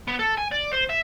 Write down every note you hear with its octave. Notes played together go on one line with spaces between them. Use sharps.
B3
A4
G#5
D5
C5
E5